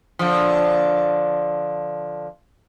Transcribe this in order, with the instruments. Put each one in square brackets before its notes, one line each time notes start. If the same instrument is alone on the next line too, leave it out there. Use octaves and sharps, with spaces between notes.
[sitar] D3 F3